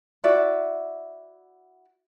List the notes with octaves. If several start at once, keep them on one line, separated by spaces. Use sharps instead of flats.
E4 F#4 D5 E5